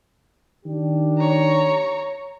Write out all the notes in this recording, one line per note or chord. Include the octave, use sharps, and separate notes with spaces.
D#3 D4 G4
C#5 A#5